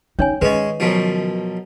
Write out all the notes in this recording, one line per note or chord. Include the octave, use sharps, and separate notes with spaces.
C#4 D#4 C#5 G#5
D#3 G#3 C#4 B4 D#5
F#2 B2 F3